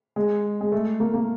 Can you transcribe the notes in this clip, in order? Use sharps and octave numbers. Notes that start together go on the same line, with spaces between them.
G#3
G#3
A3
A#3
A#3